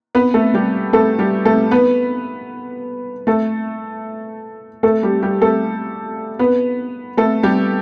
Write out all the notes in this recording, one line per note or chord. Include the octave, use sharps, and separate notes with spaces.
B3 B4
A3 A4
G3 G4
A3 A4
G3 G4
A3 A4
B3 B4
A3 A4
A3 A4
G3 G4
G3 G4
A3 A4
B3 B4
A3 A4
G3 G4